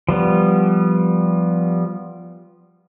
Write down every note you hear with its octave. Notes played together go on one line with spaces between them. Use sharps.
F3 G3 B3